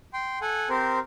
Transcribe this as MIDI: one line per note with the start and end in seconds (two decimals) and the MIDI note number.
0.13 0.39 79
0.13 0.39 84
0.42 0.69 69
0.42 0.69 78
0.42 0.69 80
0.69 0.99 60
0.69 0.99 67
0.69 0.99 70
0.69 0.99 72